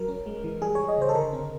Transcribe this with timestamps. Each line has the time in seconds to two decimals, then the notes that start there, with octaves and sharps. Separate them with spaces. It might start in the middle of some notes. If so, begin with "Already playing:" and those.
Already playing: F#3 A#4
0.08 C#4
0.26 G#3
0.44 E3
0.61 G3 G#4
0.75 E3 C#5
0.88 D#5
0.97 C#3 C5
1.09 A4
1.15 D3 A#4
1.33 C4